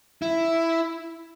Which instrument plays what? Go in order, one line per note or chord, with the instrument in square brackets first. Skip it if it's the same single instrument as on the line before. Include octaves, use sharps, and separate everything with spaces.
[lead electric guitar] E4